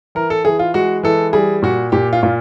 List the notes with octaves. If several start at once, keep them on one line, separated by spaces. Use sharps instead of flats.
E3 A#4
A4
E3 G#4
F4
G#3 F#4
E3 A4
G3 G#4
A#2 F#4
A#2 G4
F4
A#2 F4